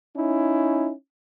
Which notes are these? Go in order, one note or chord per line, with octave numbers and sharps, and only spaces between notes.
C#4 D#4 E4